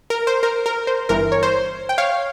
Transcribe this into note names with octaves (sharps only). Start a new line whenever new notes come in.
A#4
C5
A#4
A#4
C5
G1 G2 E3 A#4
C#5
C5
G5
C#5 F5